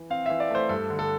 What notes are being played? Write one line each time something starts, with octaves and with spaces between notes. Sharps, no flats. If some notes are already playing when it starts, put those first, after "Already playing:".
Already playing: E3
C4 F5
E3 E5
D5
A3 C5
G2 A4
D3
A4